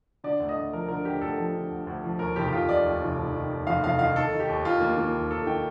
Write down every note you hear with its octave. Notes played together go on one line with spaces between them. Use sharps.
D3 D5
D2
D#5
D2
F3 A#4
D3 A#4
D2 G4
D2 A4
F3
D3
D2
D2
F3
D#2 A#4
F1 G4
G4
F1 F4
D#3 D5
D#2
F1
F1
D#3
D#2
F1 F5
F1 F5
D#3 F5
D#3 A4
D#3
G4
D#2
D#2 F4
D#3 A#3
D#3 A#3
D#2
D#2 A4
D#3 G5